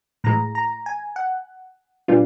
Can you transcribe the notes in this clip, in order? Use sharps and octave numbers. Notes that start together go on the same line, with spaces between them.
A2 E3 G#3 A#5
A#5
G#5
F#5
A#2 G3 B3 D4 F4